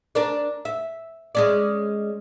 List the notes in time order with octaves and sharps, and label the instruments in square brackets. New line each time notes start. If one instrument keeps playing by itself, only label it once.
[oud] D4 A#4 D5
E5
G#3 C#4 D5